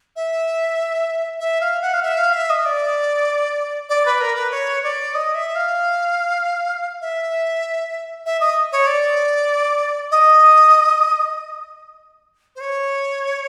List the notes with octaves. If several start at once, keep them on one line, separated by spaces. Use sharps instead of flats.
E5
E5
F5
F#5
F5
E5
F5
E5
D#5
D5
D5
B4
A#4
B4
C#5
D5
D#5
E5
F5
E5
E5
D#5
C#5
D5
D#5
C5
C#5